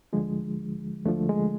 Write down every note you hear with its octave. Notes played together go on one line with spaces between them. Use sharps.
D2 D3 F3 G#3
D2 D3 F3 A3
G#3